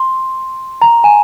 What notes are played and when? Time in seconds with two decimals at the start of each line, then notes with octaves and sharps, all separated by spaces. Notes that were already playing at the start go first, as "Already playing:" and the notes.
Already playing: C6
0.82 A#5
1.04 G#5